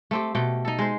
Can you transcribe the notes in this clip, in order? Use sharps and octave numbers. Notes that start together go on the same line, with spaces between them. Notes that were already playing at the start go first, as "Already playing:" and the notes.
A3 C4 G4
B2 A3 G5
D#4 A4
G#3 C5